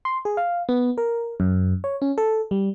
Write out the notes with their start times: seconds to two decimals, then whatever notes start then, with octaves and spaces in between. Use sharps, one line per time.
0.05 C6
0.25 G#4
0.37 F5
0.69 B3
0.98 A#4
1.40 F#2
1.84 C#5
2.02 C#4
2.18 A4
2.51 G3